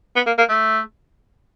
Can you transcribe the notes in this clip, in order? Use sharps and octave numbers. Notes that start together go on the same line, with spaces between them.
B3
A#3
A#3
A3